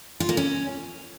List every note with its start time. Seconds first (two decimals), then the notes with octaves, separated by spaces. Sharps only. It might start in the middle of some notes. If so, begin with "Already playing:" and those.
0.20 F4
0.29 A#3
0.37 C#4